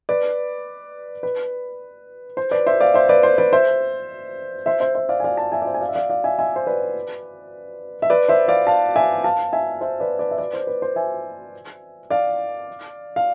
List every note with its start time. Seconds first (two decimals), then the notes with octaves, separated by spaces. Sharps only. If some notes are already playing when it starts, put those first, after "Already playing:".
0.09 B4 D5
1.23 B4
2.37 C5
2.51 B4 D5
2.66 C5 E5
2.81 D5 F5
2.94 C5 E5
3.09 B4 D5
3.23 C5
3.38 B4 D5
3.53 C5 E5
4.66 C5 E5
4.80 C5 E5
4.95 C5 E5
5.09 D5 F5
5.20 G#5
5.24 D5 F5
5.37 F5 A5
5.52 E5 G#5
5.62 D5
5.66 C5 E5
5.74 G#5
5.81 D5 F5
5.89 E5
5.95 D5 F5
6.10 D5 F5
6.24 E5 G#5
6.39 E5 G#5
6.56 C5
6.67 B4 D5
8.02 E5
8.10 B4 D5
8.28 C5 E5
8.48 D5 F5
8.67 F5 A5
8.96 E5 G#5
9.24 F5 A5
9.53 E5 G#5
9.81 C5 E5
10.00 B4 D5
10.19 B4 D5
10.31 E5
10.38 B4 D5
10.53 C5
10.67 B4
10.82 C5
10.96 E5 G#5
12.10 D5 F5
13.16 F5